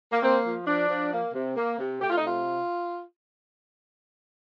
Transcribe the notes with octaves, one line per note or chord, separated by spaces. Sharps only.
A#3
A#3 C4
F3
F3 D4
F3
A#3
C3
A#3
C3
A3 G4
F4
D#4
C3 F4